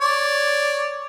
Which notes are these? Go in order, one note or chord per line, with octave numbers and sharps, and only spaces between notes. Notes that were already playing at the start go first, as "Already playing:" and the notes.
C#5 D5